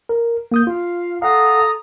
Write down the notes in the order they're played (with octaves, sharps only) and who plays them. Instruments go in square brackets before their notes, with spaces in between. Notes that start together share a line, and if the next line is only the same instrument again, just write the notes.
[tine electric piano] A#4
A#3 D#6 G6
[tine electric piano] F4 [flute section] F5
[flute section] A4 A#5 D#6 [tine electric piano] F5 F#5